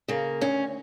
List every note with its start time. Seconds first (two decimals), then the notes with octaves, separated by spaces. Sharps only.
0.08 C#3 A#3
0.41 D2 C#4